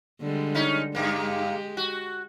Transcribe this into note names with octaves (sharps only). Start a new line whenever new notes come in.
D3 G3 G#3
C#4 D#4
G2 G#3 A#3 G4
F#4